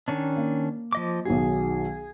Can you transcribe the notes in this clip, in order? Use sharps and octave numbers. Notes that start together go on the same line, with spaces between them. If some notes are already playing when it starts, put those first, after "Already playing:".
D#3 C#4 D4
A#3
F3 D#5 D6
B1 D#3 F#3 G#4